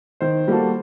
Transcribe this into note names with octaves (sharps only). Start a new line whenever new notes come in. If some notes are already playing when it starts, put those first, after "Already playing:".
D#3 C5
G3 A#3 F#4 A4